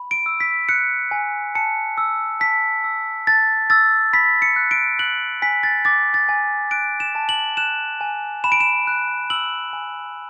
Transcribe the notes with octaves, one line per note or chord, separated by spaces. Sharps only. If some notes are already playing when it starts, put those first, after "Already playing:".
Already playing: B5
D7
E6
B6
F#6 C#7
G#5
A5 C#7
E6
A5 B6
E6
A5 A6
E6 A6
B5 B6
C#7
F#6
D7
F#6 F#7
G#5 B6
A6
D6 A6
A6
G#5
F#6 D7
E7
A5
F#7
F#6 E7
G#5
B5 E7
D7
E7
F#6
E6 F#7
G#5